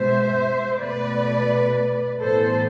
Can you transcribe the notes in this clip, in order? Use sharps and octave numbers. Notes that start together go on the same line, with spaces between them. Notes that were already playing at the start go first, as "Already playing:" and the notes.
Already playing: B2 G#3 B3 C5 E5
B2 A3 B4 D5
A2 E3 B3 A4 C5